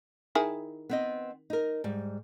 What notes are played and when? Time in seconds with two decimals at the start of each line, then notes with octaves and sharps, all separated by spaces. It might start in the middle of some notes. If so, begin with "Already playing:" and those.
0.35 D#3 E4 G#4
0.89 B3 C4 D#5
1.50 D#4 A#4
1.84 G#2 G3